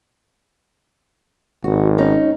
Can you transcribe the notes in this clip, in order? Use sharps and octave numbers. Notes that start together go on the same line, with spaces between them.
G#1 F#4
C#4 D#4